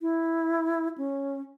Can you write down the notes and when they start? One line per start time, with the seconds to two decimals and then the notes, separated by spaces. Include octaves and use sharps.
0.02 E4
0.98 C#4